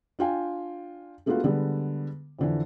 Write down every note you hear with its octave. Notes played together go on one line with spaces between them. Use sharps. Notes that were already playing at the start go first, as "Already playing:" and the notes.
D4 F4 G5 G#5
G#3 A3 B3 D4 F4 F#4
D3 G3 G#3 B3
F2 D3 E3